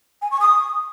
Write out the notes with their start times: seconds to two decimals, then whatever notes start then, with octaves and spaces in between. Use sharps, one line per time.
0.22 G#5
0.31 C#6
0.41 D#6